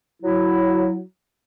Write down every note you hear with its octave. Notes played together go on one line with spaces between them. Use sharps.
F#3 E4